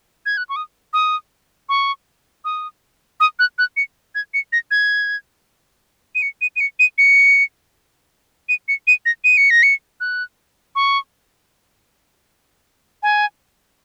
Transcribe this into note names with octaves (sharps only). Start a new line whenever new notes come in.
G#6
F#6
C#6
D#6
D#6
C#6
D#6
D#6
F#6
F#6
C#7
G#6
C#7
A#6
G#6
D#7
C#7
D#7
D#7
C#7
D#7
C#7
D#7
C#7
D#7
A#6
D#7
C#7
A#6
C#7
F#6
C#6
G#5